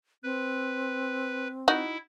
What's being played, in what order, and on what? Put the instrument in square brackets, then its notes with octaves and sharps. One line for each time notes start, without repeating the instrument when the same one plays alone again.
[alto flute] C4 [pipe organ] B4
[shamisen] D#4 F#4 [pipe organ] E4